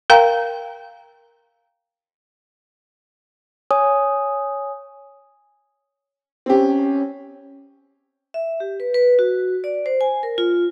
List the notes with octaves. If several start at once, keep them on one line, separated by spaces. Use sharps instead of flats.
A#4 F5 G5 A#5
C#5 G#5 D#6
C4 C#4 G4
E5
G4
B4
B4
F#4
D5
C5
G#5
A#4
F4